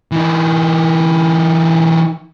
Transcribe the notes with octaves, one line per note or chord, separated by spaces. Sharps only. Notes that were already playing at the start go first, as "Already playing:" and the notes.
E3 D#4